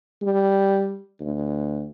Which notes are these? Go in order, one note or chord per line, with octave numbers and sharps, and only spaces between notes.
G3
D2